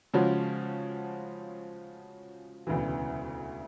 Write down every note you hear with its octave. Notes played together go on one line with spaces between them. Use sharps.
C#3 F3 G#3 C#4 F#4
E1 D2 C#3 E3